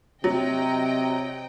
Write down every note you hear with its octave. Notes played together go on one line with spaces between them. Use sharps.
C3 F#3 D#5 G5